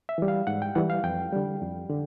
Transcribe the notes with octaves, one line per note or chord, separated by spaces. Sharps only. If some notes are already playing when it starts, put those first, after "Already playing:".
E5
E3 G3
F5
G#2 F#5
G5
E3 G3 F#5
F5
F2 G5
D3 G3
F2
D3